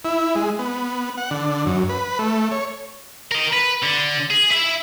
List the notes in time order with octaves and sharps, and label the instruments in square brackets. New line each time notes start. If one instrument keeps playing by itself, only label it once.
[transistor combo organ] E4
G#3
B3
F#5
D3
F#2
B4
A3
C#5
[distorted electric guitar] A#4 D#5
B4
D3
G#4
E4 E5